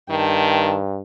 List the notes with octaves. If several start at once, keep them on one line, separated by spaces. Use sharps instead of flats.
G2 D#3 G5 A5